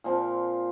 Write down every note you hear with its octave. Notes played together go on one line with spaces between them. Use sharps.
A#2 F3 C4